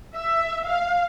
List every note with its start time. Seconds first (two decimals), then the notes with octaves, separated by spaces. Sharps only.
0.15 E5
0.66 F5